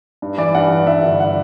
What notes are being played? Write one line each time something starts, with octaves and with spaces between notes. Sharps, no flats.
G2
E3 D5
G2 F#5
E3
G2 E5
G1
F#5